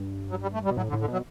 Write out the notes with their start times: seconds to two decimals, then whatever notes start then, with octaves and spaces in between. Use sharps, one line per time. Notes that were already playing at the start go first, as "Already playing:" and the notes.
Already playing: G2
0.30 F#3
0.42 G3
0.54 A3
0.65 G3
0.71 B2
0.77 A2 F#3
0.89 D3
0.93 A2
1.01 D3
1.08 B2 F#3